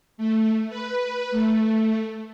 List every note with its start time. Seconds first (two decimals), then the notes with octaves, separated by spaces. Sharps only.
0.18 A3
0.70 B4
1.31 A3